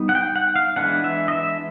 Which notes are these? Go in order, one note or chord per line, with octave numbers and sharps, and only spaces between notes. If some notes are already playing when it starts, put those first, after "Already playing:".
Already playing: G3 B3 D#4
F#5
G5
F#5
F5
E3 G#3 B3 D4 F#5
E5
D#5
E5